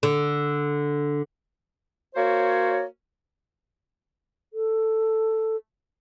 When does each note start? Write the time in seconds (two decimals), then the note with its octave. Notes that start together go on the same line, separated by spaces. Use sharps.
0.03 D3
2.15 A#3 F#4 C5 C#5
4.53 A4